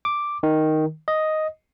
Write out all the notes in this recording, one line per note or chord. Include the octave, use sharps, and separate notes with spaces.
D6
D#3
D#5